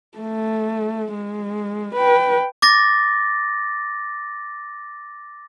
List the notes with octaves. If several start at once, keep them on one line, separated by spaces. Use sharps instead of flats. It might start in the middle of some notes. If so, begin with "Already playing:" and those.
A3
G#3
B4 G5
D6 A6 A#6